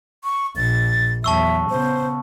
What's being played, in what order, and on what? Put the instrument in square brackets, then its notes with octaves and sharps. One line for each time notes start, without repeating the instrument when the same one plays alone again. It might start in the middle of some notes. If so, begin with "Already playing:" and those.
[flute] C#6
[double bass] A#1 [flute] A6
[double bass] E2 F#3 [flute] E5 [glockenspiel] A5 C#6 E6
[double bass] C#3 B3 [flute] C5